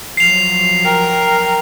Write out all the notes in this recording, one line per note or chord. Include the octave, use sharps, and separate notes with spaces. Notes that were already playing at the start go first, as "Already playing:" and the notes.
F3 F#3 C7 F7
A#4 G5